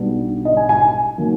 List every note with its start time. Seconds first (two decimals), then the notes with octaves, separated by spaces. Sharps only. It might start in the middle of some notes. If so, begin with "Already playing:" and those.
Already playing: B1 B2 G3 B3 D4
0.45 D#5
0.57 G#5
0.69 G#5
0.81 G#5
1.18 D#3 F#3 A#3